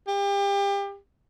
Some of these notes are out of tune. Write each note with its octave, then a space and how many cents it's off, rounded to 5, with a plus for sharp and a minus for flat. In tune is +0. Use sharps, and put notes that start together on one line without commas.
G4 +30